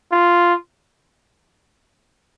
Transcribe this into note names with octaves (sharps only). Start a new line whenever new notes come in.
F4